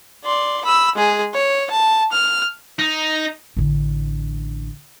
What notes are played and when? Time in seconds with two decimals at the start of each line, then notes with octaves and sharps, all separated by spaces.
0.25 D5 C6
0.65 B5 E6
0.95 G#3 G#4
1.34 C#5
1.71 A5
2.12 F6
2.79 D#4
3.57 A1 D3